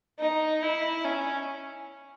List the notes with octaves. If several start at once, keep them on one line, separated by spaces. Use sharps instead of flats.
D#4
E4
C#4